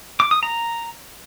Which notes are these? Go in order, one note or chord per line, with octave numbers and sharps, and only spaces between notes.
D6
D#6
A#5